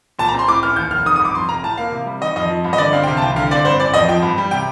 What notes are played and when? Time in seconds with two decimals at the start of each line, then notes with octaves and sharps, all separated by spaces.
0.19 A#2 A5
0.28 A#5
0.34 C4
0.39 C6
0.48 A2 D6
0.63 A1 F6
0.76 D#2 G6
0.91 F1 F6
1.05 D#3 D#6
1.16 D#6
1.20 G2
1.25 D6
1.34 F2 C6
1.49 F1 A#5
1.63 A2 A5
1.78 A#3 F5
1.92 C3
2.06 G3
2.21 D#3 D#5
2.36 F2 D#5
2.50 F3
2.64 G2
2.73 D#5
2.78 D3 D5
2.93 C4 F5
3.03 G5
3.07 C3 F5
3.17 A5
3.22 C2 G5
3.36 D3 F5
3.51 C4 D5
3.65 G2 C5
3.80 A1 D5
3.94 F2 D#5
4.08 F3 G5
4.22 G2
4.38 G3
4.51 C3 G5